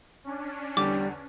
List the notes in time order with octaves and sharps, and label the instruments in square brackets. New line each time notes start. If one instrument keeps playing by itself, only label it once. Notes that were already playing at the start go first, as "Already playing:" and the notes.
[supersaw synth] C#4 D4
[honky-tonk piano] E2 D3 [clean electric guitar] G3 [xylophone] D6